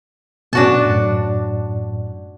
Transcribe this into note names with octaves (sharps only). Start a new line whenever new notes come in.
B2 D4 F#4 A5
F#2 A2